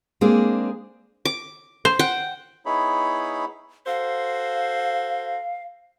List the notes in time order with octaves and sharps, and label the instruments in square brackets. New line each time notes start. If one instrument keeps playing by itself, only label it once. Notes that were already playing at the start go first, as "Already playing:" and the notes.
[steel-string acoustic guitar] G#3 A#3 C4 D4 G#4
[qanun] D6
[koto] C5
[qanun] F#5 G5
[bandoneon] B3 D#4 E4 G#4 C#5 B5
[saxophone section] F#4 A4 C5 [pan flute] F5